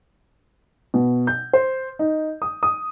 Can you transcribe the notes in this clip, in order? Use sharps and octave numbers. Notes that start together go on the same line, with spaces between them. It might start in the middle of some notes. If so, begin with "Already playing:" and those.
B2
G6
C5
D#4
D#6
D#6